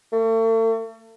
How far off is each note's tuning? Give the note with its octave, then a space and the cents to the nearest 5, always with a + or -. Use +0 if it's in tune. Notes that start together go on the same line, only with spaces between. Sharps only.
A3 +40